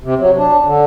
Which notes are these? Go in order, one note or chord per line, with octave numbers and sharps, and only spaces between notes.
C3
F#3
D4
D3